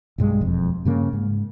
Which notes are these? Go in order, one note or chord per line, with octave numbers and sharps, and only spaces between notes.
B1 G2 G#3
E1 F2
G2 C#3 A#3
G#2